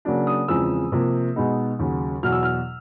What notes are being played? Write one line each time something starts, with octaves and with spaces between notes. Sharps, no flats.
C#3 F#3 A#3 D4
D#6
E2 C#3 F3 G#3 C4 E6
C3 F3 A#3
B2 G#3 B3 D#4
D#2 C#3 F#3
E2 B2 F#3 F6
E6
F6